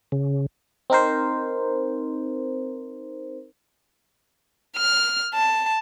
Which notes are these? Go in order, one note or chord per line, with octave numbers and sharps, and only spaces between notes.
C#3
C4 D#4 A#4 C5
F6
A5